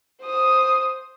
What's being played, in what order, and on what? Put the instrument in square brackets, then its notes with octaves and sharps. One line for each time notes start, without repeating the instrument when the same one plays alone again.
[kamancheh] C5 D#6